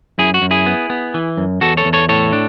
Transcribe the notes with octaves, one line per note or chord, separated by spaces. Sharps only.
F#2 E4 G#4
F#4
F#2
E4 G#4
B3
B3
E3
F#2
E2 F#4 A4
A4 C#5
E2
A4 C#5
A2 A4 C#5
D4